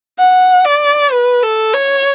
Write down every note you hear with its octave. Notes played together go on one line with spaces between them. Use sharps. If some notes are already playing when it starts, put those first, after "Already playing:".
F#5
D5
B4
A4
C#5